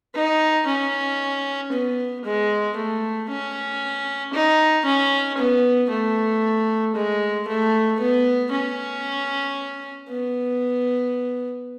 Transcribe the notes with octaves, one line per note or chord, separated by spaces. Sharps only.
D#4
C#4
B3
G#3
A3
C#4
D#4
C#4
B3
A3
G#3
A3
B3
C#4
B3